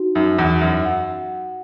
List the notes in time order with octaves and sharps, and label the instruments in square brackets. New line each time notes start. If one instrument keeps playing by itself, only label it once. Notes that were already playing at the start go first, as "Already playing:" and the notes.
Already playing: [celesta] D#4 F#4
[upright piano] F#2 [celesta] D#4
[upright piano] E2
[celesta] F#4
[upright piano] F#2
[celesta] F#5